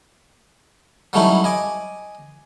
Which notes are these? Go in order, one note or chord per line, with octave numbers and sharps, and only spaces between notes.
F#3 G3 A3 C#4 D#4 E4
D#5 G#5 D6